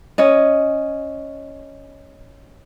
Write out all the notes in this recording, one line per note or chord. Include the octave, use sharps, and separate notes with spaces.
C#4 D#5